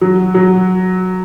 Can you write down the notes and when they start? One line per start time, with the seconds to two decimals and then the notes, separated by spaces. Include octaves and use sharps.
0.01 F#3
0.35 F#3